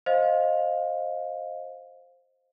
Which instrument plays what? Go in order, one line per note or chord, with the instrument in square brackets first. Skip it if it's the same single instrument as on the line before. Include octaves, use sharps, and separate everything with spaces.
[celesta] C5 D#5 F5